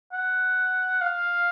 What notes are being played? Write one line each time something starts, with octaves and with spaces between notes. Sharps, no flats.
F#5
F5